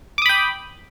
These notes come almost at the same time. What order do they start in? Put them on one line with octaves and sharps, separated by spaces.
D6 D#6 B5 G5